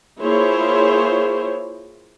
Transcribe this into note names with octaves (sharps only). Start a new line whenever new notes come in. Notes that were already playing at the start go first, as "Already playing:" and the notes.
A#3 E4 F4 G#4 C5 C#5